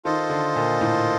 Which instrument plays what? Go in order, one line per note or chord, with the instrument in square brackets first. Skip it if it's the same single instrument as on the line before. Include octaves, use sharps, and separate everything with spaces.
[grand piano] D#3 [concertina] F4 A4 C5 D#5
[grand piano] D3
A#2
A2